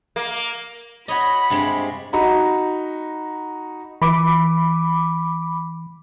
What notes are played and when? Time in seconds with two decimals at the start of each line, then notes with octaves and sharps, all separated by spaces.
0.16 A#3
1.08 F#4 C#5 D#5 B5
1.50 G2 C3 G#3
2.13 D#4 F#4 A#5 B5
4.02 E3 B5 D6